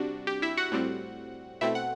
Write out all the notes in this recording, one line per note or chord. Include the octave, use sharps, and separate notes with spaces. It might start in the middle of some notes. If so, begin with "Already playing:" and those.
Already playing: C3 G3 D4 F#4
G4
E4 E5
F#4 F#5
A2 G3 C4
B2 A3 C4 E4 E5
F#5